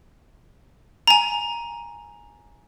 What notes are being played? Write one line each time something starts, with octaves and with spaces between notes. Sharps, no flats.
G#5 A#5